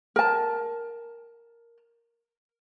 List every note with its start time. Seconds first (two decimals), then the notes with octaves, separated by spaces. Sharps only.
0.16 A#4 A5